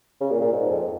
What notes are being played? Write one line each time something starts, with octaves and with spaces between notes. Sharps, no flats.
C#3
A#2
A#2
G#2
F2